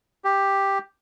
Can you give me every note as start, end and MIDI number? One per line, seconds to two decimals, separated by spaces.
0.24 0.78 67